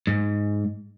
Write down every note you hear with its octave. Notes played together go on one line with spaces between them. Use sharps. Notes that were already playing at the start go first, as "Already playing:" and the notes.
G#2